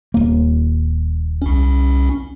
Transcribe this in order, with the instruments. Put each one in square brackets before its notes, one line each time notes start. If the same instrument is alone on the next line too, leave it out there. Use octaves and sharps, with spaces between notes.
[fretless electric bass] D#1 A#3
[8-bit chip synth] C2 C#4